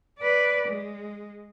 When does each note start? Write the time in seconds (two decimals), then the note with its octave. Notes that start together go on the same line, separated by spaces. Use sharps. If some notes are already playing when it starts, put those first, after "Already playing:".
0.19 B4 D5
0.68 G#3